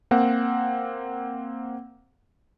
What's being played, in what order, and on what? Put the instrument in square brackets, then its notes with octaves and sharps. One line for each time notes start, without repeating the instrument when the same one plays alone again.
[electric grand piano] A#3 C4 F#5